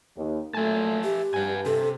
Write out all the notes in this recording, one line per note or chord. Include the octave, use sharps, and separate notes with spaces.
D#2
A#2 F#3 A3 E5 G#5 A5
G4
G2 F#5 G#5
C3 A4